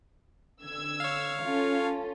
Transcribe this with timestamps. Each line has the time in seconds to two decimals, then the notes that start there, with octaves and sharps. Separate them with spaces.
0.61 D3 E6 G#6
1.00 C#5 F5
1.44 C#4 F4 A4